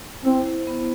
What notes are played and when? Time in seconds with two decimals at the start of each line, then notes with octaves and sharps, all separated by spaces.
0.25 C4 E4
0.46 C5
0.67 B3